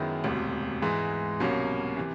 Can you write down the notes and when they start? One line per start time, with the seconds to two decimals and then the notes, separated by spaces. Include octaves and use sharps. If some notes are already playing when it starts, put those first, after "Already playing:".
Already playing: F#2 D#3 G#3 B3 E4
0.24 E1 D2 C3
0.82 G#2 E3 G#3
1.40 C2 B2 F#3 A#3 C#4
1.97 C3 E3